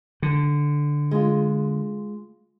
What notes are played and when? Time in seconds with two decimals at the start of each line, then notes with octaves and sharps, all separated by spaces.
0.22 D3
1.11 G#3 F4